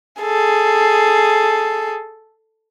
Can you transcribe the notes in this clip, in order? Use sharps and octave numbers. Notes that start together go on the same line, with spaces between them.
G#4 A4